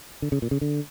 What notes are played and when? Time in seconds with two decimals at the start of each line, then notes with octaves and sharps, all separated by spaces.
0.22 D3
0.32 C#3
0.42 A#2
0.51 C#3
0.61 D3